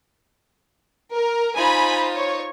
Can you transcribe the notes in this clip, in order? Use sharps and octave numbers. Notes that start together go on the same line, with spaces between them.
A#4
D#4 F4 C5 G#5 B5
C#5